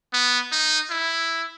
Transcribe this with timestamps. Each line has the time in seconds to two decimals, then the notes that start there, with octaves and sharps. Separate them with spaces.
0.13 B3
0.52 D#4
0.90 E4